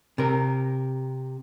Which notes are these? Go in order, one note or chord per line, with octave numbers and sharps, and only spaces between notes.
C3 A#4